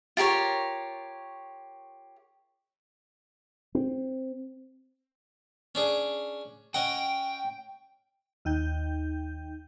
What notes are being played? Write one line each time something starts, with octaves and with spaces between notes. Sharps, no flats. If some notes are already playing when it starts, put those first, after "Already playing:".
F4 G4 A#4 C#5
C4
C#4 D4 G#4
C#4 D#5 F#5 G5
D#2 D#4 G5 G6